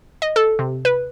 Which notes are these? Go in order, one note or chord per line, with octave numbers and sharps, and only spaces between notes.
D#5
A4
C3
B4